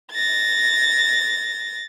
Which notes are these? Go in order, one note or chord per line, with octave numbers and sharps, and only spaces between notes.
A6 A#6